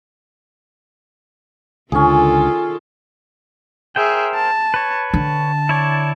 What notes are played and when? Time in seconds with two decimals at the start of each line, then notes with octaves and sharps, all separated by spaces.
1.92 C#2 D3 D#3 C#4 F4 G#4 A4
3.96 G#4 A#4 C5 E5 G5
4.35 A5
4.74 B4 C#5
5.14 D3 A5
5.69 E4 C#5 D5